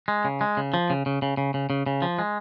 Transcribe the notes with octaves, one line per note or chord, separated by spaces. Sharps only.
G#3
C#3
G#3
C#3
F3
C#3
C#3
C#3
C#3
C#3
C#3
C#3
F3
G#3